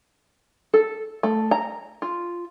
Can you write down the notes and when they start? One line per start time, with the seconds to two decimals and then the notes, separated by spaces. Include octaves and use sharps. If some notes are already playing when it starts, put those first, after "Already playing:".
0.74 A4
1.23 A3
1.51 A#5
2.02 F4